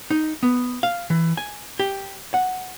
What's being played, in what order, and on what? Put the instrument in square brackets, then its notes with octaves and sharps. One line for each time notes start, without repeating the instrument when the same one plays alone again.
[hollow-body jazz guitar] D#4
B3
F5
E3
G#5
G4
F#5